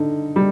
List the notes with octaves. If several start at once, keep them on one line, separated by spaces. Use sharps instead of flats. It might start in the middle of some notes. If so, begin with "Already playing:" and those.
Already playing: D3 D#4
G3